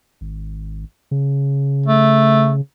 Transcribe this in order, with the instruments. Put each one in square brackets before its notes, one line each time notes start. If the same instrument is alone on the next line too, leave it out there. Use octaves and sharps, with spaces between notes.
[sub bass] G#1
C#3
[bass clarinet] A3